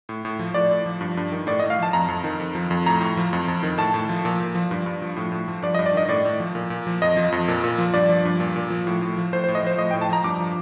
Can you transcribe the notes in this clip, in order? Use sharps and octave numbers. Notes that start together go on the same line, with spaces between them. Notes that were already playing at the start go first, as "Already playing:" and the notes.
A2
A2
F3
A2 D5
A2
F3
G2
G2
D#3
A2 D5
D#5
A2
F5
F3 A5
F2 A#5
F2
D#3
F2
F3
F2
A2 A#5
A2
F3
F2
F2
D#3
A2 A5
A2
F3
A#2
A#2
F3
G2
G2
F3
A2
A2
F3
G2 D5
D#5
G2
D5
D#3 D#5
A2 D5
A2
F3
A#2
A#2
F3
F2 D#5
F3
F2
A#2
A#2
F3
G2 D5
F3
G2
A#2
A#2
F3
A2
A2
F3
A2 C5
C5
A2
D#5
F3 C5
A2 D#5
G5
A2
A5
F3 A#5
G2 D6
F3